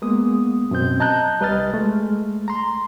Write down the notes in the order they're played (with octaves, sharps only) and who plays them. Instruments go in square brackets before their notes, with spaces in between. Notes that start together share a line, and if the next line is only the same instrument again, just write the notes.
[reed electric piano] G#3 A#3 B3 D#6
F#2 B2 C4 G6
D#5 A5 A#5 F#6 G6
C2 G3 B4 D#5 F6 A6
G#3 A3
A#5 C6